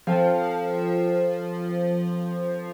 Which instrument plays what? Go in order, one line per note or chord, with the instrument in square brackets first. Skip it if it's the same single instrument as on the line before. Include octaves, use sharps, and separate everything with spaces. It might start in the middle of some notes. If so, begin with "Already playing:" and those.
[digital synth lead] F3 [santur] C4 A4 F5